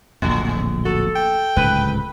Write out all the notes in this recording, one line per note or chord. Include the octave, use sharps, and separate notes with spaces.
D1 A#1 F2 A#2
F#4 A4
G5
D1 C#2 G#2 B4